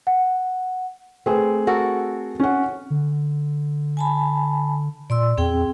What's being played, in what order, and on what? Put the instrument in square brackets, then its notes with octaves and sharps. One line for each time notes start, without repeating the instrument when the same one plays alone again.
[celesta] F#5
[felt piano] A3 G#4 B4 [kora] C4
[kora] F#4 A4 A#4
[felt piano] C#4 F#5
[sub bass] D3
[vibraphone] G#5 A5 B5
[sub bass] A#2 [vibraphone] D5 C6 E6
[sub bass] E2 [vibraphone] C4 G#4 G5